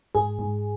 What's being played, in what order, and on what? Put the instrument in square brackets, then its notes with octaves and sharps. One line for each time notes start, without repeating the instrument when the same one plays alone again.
[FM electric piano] G#2 G#4
G#2